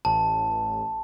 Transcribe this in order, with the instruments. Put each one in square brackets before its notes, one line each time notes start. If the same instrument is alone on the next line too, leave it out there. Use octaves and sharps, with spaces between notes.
[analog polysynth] A1 [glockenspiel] A5